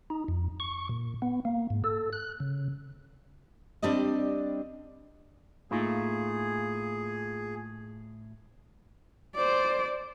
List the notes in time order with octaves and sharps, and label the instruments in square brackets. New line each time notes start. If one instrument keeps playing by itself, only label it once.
[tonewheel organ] D#4
F2
C#6
A#2
B3
A#3
G#2
A4
F#6
C#3
[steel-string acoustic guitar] G3 C4 D4 G4 D5 D#5
[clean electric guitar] A2 A3 [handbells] A#3 D#4 F4 [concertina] G#4
[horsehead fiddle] C5 D5